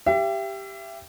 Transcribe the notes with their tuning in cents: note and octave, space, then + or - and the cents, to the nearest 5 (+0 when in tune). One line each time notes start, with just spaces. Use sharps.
G4 +0 E5 +35